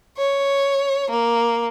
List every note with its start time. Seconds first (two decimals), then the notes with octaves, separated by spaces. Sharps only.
0.18 C#5
1.11 A#3